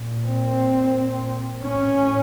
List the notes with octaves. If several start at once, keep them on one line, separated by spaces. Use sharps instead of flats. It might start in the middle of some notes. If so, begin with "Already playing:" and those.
Already playing: A#2
C4
A2 C#4